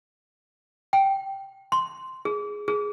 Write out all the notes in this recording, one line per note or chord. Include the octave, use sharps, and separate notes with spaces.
G5
C6
G#4
G#4